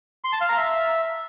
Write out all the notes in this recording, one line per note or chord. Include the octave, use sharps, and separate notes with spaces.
C6
A5
F5
A#5
E5